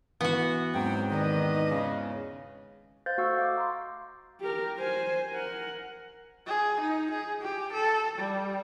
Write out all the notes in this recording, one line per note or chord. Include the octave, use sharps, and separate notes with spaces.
E3 B3 F#4
E2 G#2 F#3 C4 G5
D#3 D4 B4 D#5
C#3
C5 D#5 F5 F#6 G6 A6
A3 F#4 F5 F#5 C#6 E6
F5 D6
A#5 C6
G4 A#4
C5 G#5
A#4 F#5
G#4
D#4
G#4
G4
A4
G3